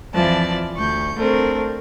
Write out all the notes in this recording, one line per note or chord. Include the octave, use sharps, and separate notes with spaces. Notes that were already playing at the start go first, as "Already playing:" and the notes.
F2 E3 F3 D5 A5
D2 C#6 G6
A3 C4 D4 A#4